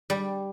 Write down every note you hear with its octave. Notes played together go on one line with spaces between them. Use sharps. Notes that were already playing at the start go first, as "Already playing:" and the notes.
G3